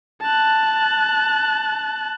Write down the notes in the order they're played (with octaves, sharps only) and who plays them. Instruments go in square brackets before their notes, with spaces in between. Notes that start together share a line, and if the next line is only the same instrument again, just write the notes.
[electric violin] A5 F#6